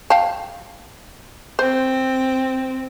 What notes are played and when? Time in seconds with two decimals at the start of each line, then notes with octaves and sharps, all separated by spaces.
0.10 F5 G5 A5
1.59 C4 C5